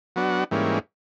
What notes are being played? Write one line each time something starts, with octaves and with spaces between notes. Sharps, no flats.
F#3 B3 D4 F#4
G#2 E3 G3 A#3 C#4